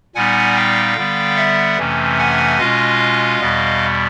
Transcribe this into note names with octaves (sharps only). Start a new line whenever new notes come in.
A#2 G3 B3 D#4 F#5 G#5
F5 G5
D3 G3 B3
E5 F#5
F2 C3 E3 A3 C#4
F#5 G#5
B2 G#3 C#4 F4 D#5 F5
E2 B2 G3 B3